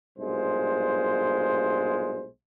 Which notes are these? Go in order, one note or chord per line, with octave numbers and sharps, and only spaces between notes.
B1 G2 A#2 G#3 C5